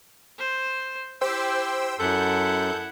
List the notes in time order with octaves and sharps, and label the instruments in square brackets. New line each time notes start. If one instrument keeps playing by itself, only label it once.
[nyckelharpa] C5
[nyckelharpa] E4 G4 [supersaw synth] C5 G5 E6
[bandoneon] F#2 [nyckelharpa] E4 F#5 [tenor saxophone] A4 [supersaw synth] G6